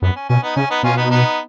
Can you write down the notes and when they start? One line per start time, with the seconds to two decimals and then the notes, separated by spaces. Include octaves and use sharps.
0.02 F#2 B3
0.16 C#4
0.29 B2 C#4
0.43 B3 D#4
0.56 C#3 C#4
0.70 B3 D#4
0.83 B2 C#4 F4
0.97 B3 D#4
1.10 B3 D#4